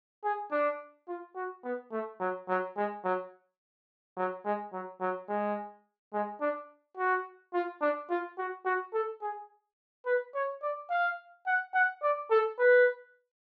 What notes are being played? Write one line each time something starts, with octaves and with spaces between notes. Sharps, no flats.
G#4
D4
F4
F#4
B3
A3
F#3
F#3
G#3
F#3
F#3
G#3
F#3
F#3
G#3
G#3
D4
F#4
F4
D4
F4
F#4
F#4
A4
G#4
B4
C#5
D5
F5
F#5
F#5
D5
A4
B4